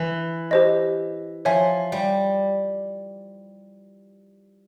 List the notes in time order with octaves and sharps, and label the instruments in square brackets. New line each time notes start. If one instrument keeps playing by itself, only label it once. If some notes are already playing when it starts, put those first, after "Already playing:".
Already playing: [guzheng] E3
[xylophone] G4 C5 D#5
[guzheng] F3 [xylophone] C#5 E5 G#5
[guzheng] G3